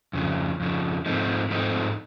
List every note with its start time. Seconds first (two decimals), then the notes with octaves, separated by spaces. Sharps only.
0.13 F2 C#3 F3
0.60 F2 C#3 F3
1.06 G#2 F3 A3 C4 D#4
1.50 G#2 F3 A3 C4 D#4